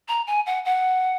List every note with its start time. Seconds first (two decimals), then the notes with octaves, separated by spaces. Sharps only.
0.08 A#5
0.27 G#5
0.46 F#5
0.65 F#5